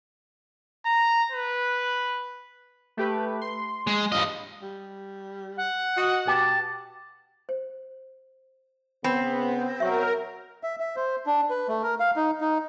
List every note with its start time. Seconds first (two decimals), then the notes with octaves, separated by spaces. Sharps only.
0.86 A#5
1.32 B4
2.97 A3 G4 B4
3.41 C6
3.87 G#3
4.12 G2 F4 D#5
4.62 G3
5.57 F#5
5.97 F#4 D#5
6.27 B2 G4 A5
7.49 C5
9.04 C#3 B3 C4 B5
9.80 B2 F#3 A#4 E5 C#6
10.63 E5
10.80 E5
10.96 C5
11.26 D4
11.50 B4
11.68 A3
11.83 A#4
12.00 F5
12.16 D#4
12.41 D#4